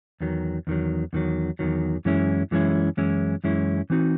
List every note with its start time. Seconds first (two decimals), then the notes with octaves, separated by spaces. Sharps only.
0.21 E2 D#3 F#3
0.67 E2 D#3 F#3
1.13 E2 D#3 F#3
1.59 E2 D#3 F#3
2.05 F#2 E3 G#3 C#4 E4
2.51 F#2 E3 G#3 C#4 E4
2.97 F#2 E3 G#3 C#4 E4
3.44 F#2 E3 G#3 C#4 E4
3.90 E3 C4 D#4 F#4